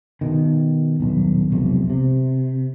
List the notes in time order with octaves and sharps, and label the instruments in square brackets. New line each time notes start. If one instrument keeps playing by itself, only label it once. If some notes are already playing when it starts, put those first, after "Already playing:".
[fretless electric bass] B2 D#3
D#1 B1
E1 B1 F2 C3
C3